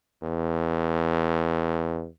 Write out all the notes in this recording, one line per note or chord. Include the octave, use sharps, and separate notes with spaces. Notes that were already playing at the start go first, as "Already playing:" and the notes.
E2